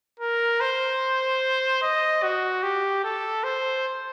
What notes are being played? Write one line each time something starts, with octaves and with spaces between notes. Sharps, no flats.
A#4
C5
D#5
F#4
G4
A4
C5